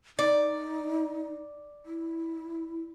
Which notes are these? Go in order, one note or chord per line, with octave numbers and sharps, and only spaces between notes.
D#4 D5
E4